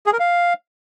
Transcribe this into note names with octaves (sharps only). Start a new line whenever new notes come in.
G#4
A#4
F5